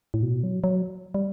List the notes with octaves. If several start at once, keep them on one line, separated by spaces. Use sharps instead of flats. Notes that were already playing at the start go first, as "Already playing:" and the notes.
A2
B2
F#3
F#3
G3